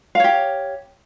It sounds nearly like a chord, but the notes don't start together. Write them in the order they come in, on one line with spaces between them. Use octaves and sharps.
F5 C#5 G4